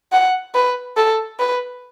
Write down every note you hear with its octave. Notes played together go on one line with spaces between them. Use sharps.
F#5
B4
A4
B4